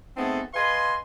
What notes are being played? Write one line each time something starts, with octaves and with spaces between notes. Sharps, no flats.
A3 B3 C4 D#4 G#4 A4
B4 D#5 F5 G#5 C6